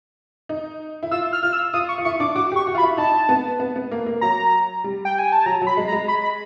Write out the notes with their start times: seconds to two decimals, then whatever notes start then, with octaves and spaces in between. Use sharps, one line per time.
0.49 D#4
1.03 E4
1.11 F4 E6
1.33 F6
1.43 F4 F6
1.53 E6
1.74 F4 D#6
1.89 C#6
1.98 F4
2.05 E4 C#6
2.20 D4 D6
2.36 F#4 D6
2.52 G4 C#6
2.67 F#4
2.75 F4
2.78 B5
2.83 E4
2.97 D#4 A5
3.29 B3
3.60 B3
3.76 B3
3.91 A#3
4.06 A#3
4.21 F#3 A#5
4.84 G3
5.05 G5
5.19 G#5
5.32 A5
5.46 F#3 A#5
5.62 F#3
5.67 B5
5.77 G#3
5.88 A#5
5.93 G#3
6.08 B5
6.23 B5